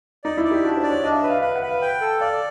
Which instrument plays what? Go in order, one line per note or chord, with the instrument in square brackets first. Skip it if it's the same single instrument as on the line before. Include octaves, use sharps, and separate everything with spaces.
[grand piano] D#4 [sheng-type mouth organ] D5
[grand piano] E4
[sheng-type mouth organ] D5
[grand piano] G4
[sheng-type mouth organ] D4 [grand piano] F#4
[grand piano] C5
[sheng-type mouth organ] D5
[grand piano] C#5
[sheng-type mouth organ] D4 [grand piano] D#5
[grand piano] E5
D#5
[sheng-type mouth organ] B4
[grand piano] F5
[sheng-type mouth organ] B4 [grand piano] F5
[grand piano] F#5
[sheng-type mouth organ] B4
[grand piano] F5
[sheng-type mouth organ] G5
A4
[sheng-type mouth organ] D5 [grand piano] F5